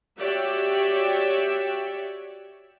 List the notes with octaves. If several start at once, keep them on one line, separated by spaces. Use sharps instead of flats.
F#4 G4 C#5 D5 E5 G5